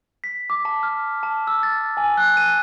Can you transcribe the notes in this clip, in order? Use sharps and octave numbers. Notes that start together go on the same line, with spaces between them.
B6
D6
A5
F6
A5
E6
A6
G#5
F#6
D#7